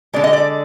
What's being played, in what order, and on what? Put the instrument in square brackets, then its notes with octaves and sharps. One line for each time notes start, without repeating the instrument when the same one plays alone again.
[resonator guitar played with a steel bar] D3 G#3 D5
D#5
D5